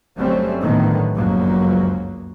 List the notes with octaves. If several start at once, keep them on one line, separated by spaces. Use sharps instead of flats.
G1 F#3 G3 A3 C4 C#4
A2 D3 D#3 F#3 G3 B3
G1 C#2 F#2 F3 F#3 A#3